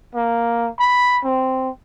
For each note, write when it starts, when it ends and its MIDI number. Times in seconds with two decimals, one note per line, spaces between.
0.15 0.68 58
0.80 1.18 83
1.24 1.70 60